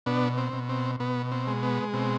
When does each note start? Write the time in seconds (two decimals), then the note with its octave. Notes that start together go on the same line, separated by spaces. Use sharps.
0.06 B2 B3 D4
0.38 C4
0.53 B2
0.69 C4
1.00 B2 B3
1.31 C4
1.47 G#3
1.63 B3
1.93 B2 C4